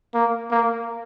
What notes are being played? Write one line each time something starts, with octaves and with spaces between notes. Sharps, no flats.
A#3
A#3